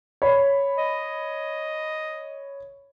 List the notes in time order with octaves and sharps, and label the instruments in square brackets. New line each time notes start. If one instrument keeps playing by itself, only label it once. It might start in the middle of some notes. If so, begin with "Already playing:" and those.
[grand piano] C#5 B5
[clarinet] D#5